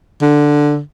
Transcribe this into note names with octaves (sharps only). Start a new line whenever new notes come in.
D3